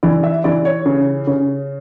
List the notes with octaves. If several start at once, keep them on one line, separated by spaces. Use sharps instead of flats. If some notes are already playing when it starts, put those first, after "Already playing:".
E3 D5
E5
E3 D5
C#5
C#3
C#3